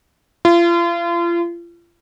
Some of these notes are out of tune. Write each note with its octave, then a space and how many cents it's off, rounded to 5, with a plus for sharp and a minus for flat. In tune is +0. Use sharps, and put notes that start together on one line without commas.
F4 -35